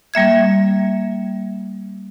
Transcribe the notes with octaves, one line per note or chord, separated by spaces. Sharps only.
G3 A#3 E5 G#6